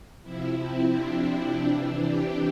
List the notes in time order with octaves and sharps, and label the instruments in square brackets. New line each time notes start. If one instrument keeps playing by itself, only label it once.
[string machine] C3 F3 E4
C4
D4
C3 E3 D4
G4